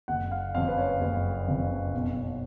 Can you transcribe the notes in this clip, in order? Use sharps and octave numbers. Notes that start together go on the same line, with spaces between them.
F#1 F#5
F5
F2 C#3 F5
B4
C#5
F#1
F2 C#3
B1